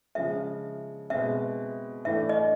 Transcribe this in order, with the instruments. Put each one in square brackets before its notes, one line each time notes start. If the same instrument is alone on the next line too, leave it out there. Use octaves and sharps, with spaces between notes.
[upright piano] C#3 F3 G#3 [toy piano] E5
[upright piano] B2 G#3 C4 [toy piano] E5
[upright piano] A2 E3 A3 D4 [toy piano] E5
[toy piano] D#5